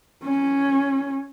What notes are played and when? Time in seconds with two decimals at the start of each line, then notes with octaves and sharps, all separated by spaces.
0.24 C#4